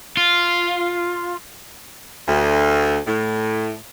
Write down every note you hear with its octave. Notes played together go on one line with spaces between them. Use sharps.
F4
D2
A2